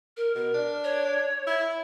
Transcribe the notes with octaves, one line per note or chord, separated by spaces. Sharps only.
A#4
B2 A#4
D4
C#5
E4